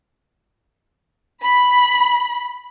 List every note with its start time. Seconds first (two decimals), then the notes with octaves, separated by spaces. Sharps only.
1.40 B5